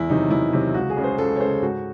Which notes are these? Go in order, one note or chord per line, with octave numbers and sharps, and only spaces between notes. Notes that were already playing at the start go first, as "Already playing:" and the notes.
Already playing: E2 E4
C3 D#3 F#3 D#4
E2 E4
C3 D#3 F#3
C#2 F#4
G#4
C#3 G#3
C5
C#2 A4
C#5
C#3 G#3 C5
G#2 F#4